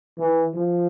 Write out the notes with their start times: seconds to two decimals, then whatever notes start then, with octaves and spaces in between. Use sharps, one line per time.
0.18 E3
0.54 F3